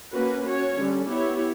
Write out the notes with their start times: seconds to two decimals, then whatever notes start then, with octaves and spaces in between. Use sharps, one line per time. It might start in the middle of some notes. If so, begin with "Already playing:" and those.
0.13 A#3 C#4 F#4 B4
0.46 C#4 F#4 C#5
0.77 D3 G3 C#4
1.09 B3 E4 G4 C#5